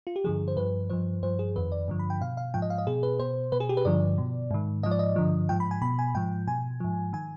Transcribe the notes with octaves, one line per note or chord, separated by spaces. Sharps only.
F4
G4
G2 D3 F3 G#4
C5
G2 F3 B4
G2 F3 C5
G2 F3 C5
G#4
F2 D#3 B4
D5
G2 D3 F3
B5
G5
B2 F5
F5
G#2 F3 G5
D#5
F5
D#5
B2 G#4
B4
B2 C5
B2 B4
G#4
G4
B4
G2 D3 F3 D5
B2
G#2 D#3
G#2 F3 D#5
D5
D#5
G2 D3 F3
G#2 F3 G5
B5
G#5
B2 B5
G#5
G#2 F3 G5
B2 G#5
G#2 F3
D#3 G#5